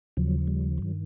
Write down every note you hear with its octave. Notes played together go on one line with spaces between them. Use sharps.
D#2 C#3 F3 F#3
G3
G2 D#3 F#3